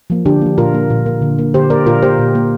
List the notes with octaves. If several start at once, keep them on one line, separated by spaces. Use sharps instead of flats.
F3 A#3
D3 D4 G4
F3 A#3
A#2 F4 A#4
A#3
A#2
A#3
D3
A#3
D3 G4 C5
A#3 A#4 D5
A#2 F4 A#4
A#3 G4 C5
A#2
A#3